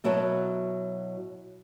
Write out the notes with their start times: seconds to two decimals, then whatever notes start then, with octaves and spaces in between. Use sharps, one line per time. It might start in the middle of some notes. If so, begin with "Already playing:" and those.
0.04 B2 F#3 E4 A#4 C#5 A5